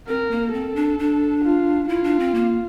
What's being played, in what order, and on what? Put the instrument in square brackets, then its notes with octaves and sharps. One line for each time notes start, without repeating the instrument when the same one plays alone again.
[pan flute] C4 [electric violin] A#4
[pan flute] A#3
[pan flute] C4 [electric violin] A4
[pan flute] D4
D4
[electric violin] F4
[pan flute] E4 [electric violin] F4
[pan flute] D4
C4
A#3